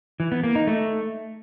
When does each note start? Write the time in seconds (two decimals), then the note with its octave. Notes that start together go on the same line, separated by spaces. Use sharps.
0.20 E3
0.32 B3
0.43 A#3
0.55 D#4
0.67 A3